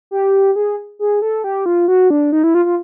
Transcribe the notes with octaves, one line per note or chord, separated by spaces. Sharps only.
G4
G#4
G#4
A4
G4
F4
F#4
D4
D#4
E4
F4
F4